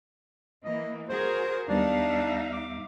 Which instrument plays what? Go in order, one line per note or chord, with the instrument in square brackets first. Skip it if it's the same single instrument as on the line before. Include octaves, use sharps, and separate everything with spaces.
[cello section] E3 A#3 [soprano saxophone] D#5
[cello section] F#4 G#4 A#4 [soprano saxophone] C5
[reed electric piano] D#2 G3 B3 [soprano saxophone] D4 [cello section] D#4 E5 F5
[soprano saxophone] D6